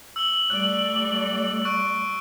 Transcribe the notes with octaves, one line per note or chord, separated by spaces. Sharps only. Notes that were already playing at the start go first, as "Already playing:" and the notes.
E6 F#7 G7
G3 A3 D5 F#6
C#6 F#6 D7